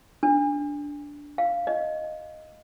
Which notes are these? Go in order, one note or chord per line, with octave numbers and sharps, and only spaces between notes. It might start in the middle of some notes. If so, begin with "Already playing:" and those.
D4
F5
D#5